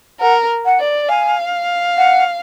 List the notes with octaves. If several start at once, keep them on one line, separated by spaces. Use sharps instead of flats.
A#4 F#5
F#5
D5
F5 G#5
F#5